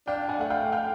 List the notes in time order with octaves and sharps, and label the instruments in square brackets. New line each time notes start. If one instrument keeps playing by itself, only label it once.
[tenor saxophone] D4 [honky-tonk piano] F5 G5
[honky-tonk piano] F#5 G#5
[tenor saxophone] A3 [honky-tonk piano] F#5
[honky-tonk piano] F5 G5
F5 G5